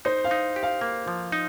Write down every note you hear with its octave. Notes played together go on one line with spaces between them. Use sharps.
D#4 C5
F5
D#4
G4
F5
A#3
F3
D#4